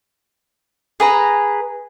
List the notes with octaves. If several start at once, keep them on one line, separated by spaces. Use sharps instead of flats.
G#4 B4 A#5